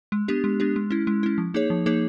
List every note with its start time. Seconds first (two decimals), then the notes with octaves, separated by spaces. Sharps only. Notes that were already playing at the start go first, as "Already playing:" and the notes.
0.12 G#3
0.28 B3 D4 G4
0.44 G#3
0.60 B3 D4 G4
0.76 G#3
0.91 C#4 E4
1.07 G#3
1.23 C#4 E4
1.38 F3
1.54 A#3 D#4 G#4 C#5
1.70 F3
1.86 A#3 D#4 G#4 C#5